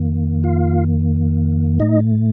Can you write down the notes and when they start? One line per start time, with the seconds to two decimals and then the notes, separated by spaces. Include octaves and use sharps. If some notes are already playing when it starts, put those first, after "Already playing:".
Already playing: F2 D#3 A#3
0.43 F4 F5
1.80 A2 A3 D#4 D#5